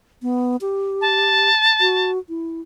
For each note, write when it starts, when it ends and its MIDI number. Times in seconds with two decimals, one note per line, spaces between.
0.22 0.56 59
0.61 1.49 67
1.01 2.10 81
1.80 2.19 66
2.29 2.61 64